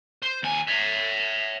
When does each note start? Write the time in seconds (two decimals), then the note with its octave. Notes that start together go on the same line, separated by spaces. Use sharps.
0.22 C5
0.43 D#2 G#5
0.67 C#5 E5